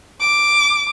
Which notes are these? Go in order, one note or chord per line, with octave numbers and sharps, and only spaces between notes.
D6